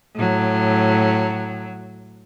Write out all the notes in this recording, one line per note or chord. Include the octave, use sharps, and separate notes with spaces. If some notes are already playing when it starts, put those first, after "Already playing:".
A2 F#3